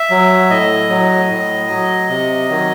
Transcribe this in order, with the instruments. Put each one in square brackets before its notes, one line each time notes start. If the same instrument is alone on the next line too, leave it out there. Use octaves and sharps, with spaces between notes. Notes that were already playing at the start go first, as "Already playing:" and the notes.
Already playing: [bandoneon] E5
F#3
A2 D#5
F#3
A2
F#3
C3
D#3 F#3